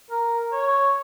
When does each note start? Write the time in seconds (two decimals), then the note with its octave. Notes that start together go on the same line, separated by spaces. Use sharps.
0.11 A#4
0.52 C#5